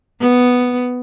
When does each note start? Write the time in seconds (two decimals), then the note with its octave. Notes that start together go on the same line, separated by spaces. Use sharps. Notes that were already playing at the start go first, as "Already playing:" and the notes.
0.20 B3